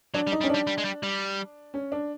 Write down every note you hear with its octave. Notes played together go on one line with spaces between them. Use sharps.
F#3 D4
G3
D#4
G3
C#4
D4
G3
G3
G#3
G3
G3
C#4
D4